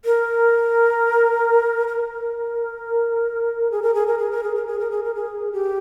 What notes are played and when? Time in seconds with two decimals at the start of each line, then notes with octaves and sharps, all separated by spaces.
0.05 A#4
1.88 A#4
3.71 G#4
3.82 A#4
3.94 G#4
4.07 A#4
4.19 G#4
4.31 A#4
4.43 G#4
4.55 A#4
4.67 G#4
4.79 A#4
4.91 G#4
5.04 A#4
5.15 G#4
5.53 G4